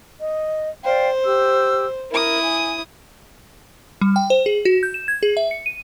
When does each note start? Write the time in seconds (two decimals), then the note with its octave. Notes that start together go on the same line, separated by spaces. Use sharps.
0.20 D#5
0.84 C5 D5 F5 G5
1.24 G4 E6
2.11 E4 A#4 D#6
2.43 G#5
4.01 G3
4.16 G5
4.30 C5
4.46 G#4
4.65 F#4
4.83 G6
4.94 E7
5.08 G#6
5.23 G#4
5.37 E5
5.51 C#7
5.66 D#7